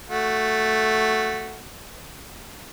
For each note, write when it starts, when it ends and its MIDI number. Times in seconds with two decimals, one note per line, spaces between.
0.10 1.67 57
0.10 1.67 66